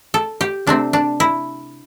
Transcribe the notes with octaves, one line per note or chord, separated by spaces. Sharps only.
A4
G4
C3 A3 C4 D4
D4
E4